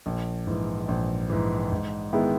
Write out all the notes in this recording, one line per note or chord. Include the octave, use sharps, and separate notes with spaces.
A#1
G#2 E3
A#1
G#2 E3
G#2
D#3 G#3 B3 E4